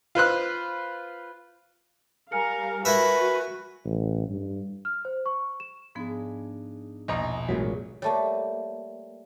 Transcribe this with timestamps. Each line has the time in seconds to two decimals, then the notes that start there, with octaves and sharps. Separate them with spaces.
0.15 F4 B4 C5 F#6
2.32 G3 A#4 F5 G#5 F6 C#7
2.85 E4 F#4 A#4 B4 E5
3.85 A1
4.28 G2
4.85 F6
5.05 C5
5.26 C#6
5.60 E7
5.95 G#2 F3 B3 D4 D#4 G#4
7.08 A#1 E2 B2 A#3 D#5 A#5 D#6 A#6
7.24 G#5
7.49 A1 D2 A#2 F#3 G#3 C#4 G#4 B4
8.02 G3 A3 A#3 C#5 A5